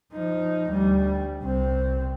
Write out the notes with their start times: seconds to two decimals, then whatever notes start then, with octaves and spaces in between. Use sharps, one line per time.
0.13 F3 D#4
0.70 D2 G3
1.42 C2 C4